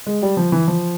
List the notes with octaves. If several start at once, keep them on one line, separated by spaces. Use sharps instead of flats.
G#3
G3
F3
E3
F3